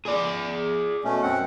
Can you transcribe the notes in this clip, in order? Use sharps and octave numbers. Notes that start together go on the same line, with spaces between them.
G#4 D5
B2 A3 C#4
F#2 C4 F#5